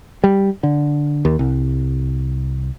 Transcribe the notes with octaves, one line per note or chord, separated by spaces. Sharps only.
G3
D3
D#2
C2